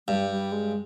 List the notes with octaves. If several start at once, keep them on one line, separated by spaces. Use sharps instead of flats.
G2 G3
G3
G#3